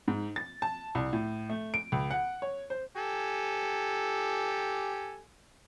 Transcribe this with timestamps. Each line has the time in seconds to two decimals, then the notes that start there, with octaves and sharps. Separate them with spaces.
0.08 G#2
0.36 A6
0.62 A5
0.95 C2
1.13 A2
1.50 A3
1.74 D7
1.92 C#2
2.11 F#5
2.42 C#5
2.70 C5
2.96 G4 A4 G#5